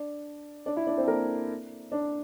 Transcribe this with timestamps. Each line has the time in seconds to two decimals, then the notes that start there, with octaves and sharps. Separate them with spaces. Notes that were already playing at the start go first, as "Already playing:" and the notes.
Already playing: D4 D5
0.66 D4 D5
0.76 E4 E5
0.87 D4 D5
0.97 C4 C5
1.03 A4
1.08 A#3 A#4
1.92 D4 D5